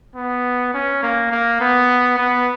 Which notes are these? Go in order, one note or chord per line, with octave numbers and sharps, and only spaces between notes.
B3
C#4
A#3
A#3
B3
B3